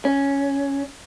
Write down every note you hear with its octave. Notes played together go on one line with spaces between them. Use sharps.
C#4